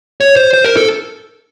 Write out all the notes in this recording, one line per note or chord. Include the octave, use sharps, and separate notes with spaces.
C#5
C5
C5
A#4
A4